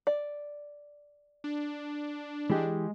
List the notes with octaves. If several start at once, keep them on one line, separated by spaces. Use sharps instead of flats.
D5
D4
E3 G#3 G4